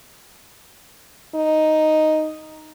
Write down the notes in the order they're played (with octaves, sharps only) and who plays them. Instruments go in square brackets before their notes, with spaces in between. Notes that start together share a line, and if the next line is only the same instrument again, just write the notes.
[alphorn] D#4